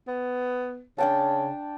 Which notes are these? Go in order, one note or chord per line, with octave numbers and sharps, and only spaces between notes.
B3
C#3 D4 G5 A5